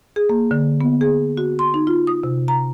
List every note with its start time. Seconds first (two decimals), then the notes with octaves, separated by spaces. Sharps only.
0.16 G#4
0.29 A#3
0.51 D3
0.81 B3
1.01 G#4
1.37 F#4
1.59 C6
1.74 D#4
1.87 F4
2.07 D#6
2.23 C3
2.48 A#5